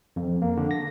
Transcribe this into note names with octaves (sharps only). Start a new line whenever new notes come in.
F2
A#3
D3
A#6